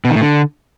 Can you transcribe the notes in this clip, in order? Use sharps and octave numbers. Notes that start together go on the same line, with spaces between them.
B2
D#3
A2
D3